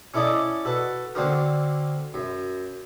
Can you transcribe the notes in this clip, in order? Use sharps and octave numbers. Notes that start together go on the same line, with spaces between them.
C#4 E4 A4 D5 D#5
F#4 A4 B4
D3 A#3 C4 D4 F#4 A#4
F#2